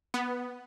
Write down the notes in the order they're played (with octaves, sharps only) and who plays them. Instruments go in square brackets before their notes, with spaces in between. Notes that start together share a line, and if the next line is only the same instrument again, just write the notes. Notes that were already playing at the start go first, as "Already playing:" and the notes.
[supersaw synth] B3